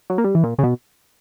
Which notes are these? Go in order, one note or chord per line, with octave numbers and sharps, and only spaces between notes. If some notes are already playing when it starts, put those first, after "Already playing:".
F#3
A#3
G3
E3
A#2
C#3
B2